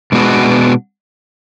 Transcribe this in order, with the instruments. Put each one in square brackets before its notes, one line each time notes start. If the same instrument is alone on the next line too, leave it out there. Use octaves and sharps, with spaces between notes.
[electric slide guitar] B2 G#3 B3 D4 F#4